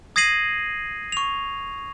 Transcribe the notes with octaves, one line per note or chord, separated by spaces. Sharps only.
D#6 G#6 A#6 C7 D#7 F#7
C#6 F7